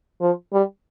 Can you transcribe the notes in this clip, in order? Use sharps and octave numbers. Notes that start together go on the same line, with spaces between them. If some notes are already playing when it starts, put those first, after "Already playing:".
F3
G3